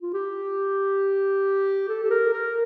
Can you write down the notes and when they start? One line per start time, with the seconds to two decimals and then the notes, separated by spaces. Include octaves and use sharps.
0.02 F4
0.13 G4
1.89 A4
2.03 A4
2.10 A#4
2.33 A#4